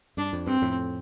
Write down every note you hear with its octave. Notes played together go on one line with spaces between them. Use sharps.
G2 D4
F2
G2 C4
F2 A2